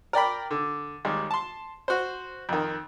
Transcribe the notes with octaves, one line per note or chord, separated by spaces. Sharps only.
A#4 D5 G5 B5
D3
D#2 G3 G#3
A5 C6
F#4 C5
F2 D#3